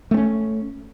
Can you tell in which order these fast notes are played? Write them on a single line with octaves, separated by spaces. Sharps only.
A3 C4 C#4